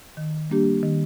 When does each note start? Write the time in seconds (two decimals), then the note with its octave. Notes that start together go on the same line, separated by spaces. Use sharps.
0.17 D#3
0.50 G3 A#3 D4 G4
0.83 D#3